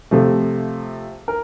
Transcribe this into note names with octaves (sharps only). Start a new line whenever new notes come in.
C3 F3 A3
A#4